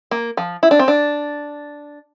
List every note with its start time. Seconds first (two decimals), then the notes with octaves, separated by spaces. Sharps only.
0.11 A#3
0.37 F3
0.63 E4
0.71 D4
0.79 C4
0.88 D4